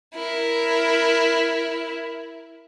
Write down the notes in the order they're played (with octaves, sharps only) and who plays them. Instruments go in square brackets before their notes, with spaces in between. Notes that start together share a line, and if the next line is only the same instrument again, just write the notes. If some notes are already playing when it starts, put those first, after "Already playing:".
[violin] E4 A#4